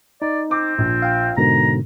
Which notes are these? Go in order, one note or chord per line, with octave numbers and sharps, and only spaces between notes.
D#4 D5
C4 D6
A#1
F5 G5
G#2 B2 D3 A#4 A#5